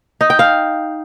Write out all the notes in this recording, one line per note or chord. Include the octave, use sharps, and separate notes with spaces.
D#4
G5
F5